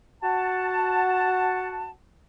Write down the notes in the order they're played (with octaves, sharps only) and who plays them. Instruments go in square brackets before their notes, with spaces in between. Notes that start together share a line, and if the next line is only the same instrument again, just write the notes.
[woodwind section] F#4 F#5 A5